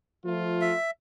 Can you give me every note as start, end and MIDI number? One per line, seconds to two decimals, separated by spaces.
0.25 0.73 53
0.25 0.73 57
0.25 0.73 65
0.61 0.91 76